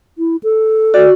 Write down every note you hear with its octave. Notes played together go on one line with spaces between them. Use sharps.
E4
A4
F#4 D5